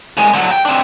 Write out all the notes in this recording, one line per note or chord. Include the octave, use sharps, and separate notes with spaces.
C2 G#3
D3 F#3
G5
C4 D4